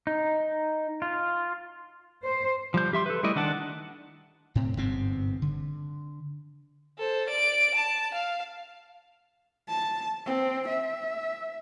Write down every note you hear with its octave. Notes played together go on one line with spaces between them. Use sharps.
D#4
F4
C5
F3 G3 G6
G4 E5 C6
A4 B4
G3 A3 E4 D5 D#5
D#3 D4 F#5 A5
A2 C4
G1 G#2 C3 C4
D3
A4 C5
D5 D7
A5
F5
A5
C4
E5